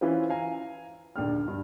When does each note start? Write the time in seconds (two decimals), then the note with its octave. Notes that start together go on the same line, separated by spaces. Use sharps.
0.01 E3 C#4 E4 F4 B4 C5
0.30 F5 G#5 A#5
1.16 A#1 D#2 D3 G5 F6
1.48 G2